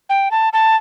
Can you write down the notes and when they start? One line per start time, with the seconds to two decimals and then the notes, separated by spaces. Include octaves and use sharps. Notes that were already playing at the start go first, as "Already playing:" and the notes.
0.09 G5
0.31 A5
0.53 A5